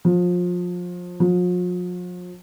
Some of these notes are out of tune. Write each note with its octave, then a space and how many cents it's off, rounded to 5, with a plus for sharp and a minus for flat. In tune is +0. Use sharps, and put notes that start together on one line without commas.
F3 +30
F3 +45